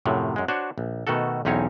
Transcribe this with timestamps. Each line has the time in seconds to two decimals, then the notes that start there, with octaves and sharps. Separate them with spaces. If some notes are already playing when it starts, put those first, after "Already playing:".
0.06 F#2 A2 C3 F3 F#3
0.36 F#2 G#3
0.48 D4 F#4 C5 C#5
0.78 A#1
1.07 B2 D#3 A3 F#4 A4
1.45 B1 E2 C4 C#4 D#4 C#5